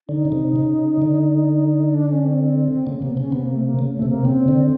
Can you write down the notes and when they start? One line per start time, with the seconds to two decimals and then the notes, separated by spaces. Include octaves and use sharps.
0.09 D3 D#4
0.25 C#3
0.32 C3
0.56 C#3
1.02 D3
1.94 D4
2.09 C#4
2.25 C4
2.86 C#3 A#3
2.97 A#3
3.02 C3
3.10 B3
3.17 C#3 C#4
3.32 C3 B3
3.43 A#3
3.55 A3
3.67 A#3
3.79 C#3
3.94 A3
4.02 C3
4.09 A#3
4.25 C#3 C4
4.48 D3